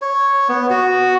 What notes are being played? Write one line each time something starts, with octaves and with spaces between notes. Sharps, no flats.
C#5
B3
F#4